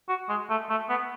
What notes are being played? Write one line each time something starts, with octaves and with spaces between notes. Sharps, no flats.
F#4
G#3
A3
A3
B3